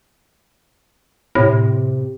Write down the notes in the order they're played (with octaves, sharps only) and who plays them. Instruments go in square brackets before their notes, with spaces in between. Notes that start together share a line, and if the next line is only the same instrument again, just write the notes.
[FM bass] A2 [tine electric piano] C3